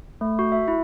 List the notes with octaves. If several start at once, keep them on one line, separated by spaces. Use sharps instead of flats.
A3
F#4
E5
E4